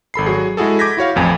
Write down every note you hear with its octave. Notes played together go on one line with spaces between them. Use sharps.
G#1 A4 B5 C7
F#3 F#4 G#4
G#3 E4 F#4 G#4 A4
D6 G6 G#6 A#6 B6
E4 F#4 C#5 F5
A1 F2 G#5